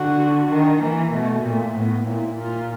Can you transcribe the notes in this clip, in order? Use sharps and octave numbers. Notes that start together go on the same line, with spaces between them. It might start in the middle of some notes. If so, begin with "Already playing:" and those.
Already playing: D3 F#4
D#3 D4
E3 A#3
B2 A3
A#2 A3
A2 B3
A#2 E4
A#2 F4